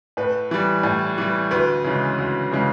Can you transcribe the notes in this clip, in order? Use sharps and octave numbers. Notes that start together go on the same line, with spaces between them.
A2 B4
E3 G3
A2
E3 G3
D2 B4
C#3 E3 G#3
D2
C#3 E3 G#3